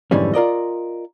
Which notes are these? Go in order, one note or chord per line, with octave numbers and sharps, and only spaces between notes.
F2 G#2 D3 E3 G3 C#4
F4 A#4 D5 D#5